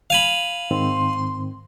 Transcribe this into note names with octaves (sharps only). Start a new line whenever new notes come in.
F5 G#5 B5
G#2 D#3 C4 C6